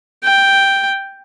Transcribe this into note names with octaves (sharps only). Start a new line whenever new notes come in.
G5